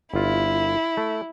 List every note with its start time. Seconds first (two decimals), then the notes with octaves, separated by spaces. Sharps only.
0.14 G1 E4 F4
0.97 A3